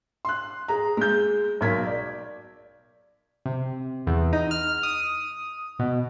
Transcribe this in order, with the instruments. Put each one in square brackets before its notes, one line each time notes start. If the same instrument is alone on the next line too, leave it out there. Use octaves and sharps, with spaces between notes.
[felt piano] C6 F#6
G#4 A#5
G#3 G6
B1 A#4 G#6 B6
D5
[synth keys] C3
E2
D#4
F6
D#6
B2